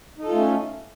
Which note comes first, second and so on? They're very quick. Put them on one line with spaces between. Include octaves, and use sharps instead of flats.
D#4 A4 F4 A3 C#4